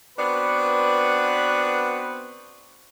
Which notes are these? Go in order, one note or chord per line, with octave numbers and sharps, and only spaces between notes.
B3 C4 D4 F#4 B4